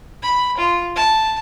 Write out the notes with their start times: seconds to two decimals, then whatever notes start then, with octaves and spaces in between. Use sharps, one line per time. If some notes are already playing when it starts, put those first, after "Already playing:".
0.23 B5
0.58 F4
0.96 A5